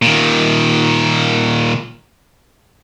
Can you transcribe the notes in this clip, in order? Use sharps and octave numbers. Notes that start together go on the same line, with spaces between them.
A#2 D#3